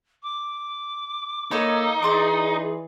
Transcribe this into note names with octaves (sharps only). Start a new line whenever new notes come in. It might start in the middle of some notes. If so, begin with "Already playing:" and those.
D6
A#3 D#4 A4 C#5 B5
E3 G#4 D5 C6 D6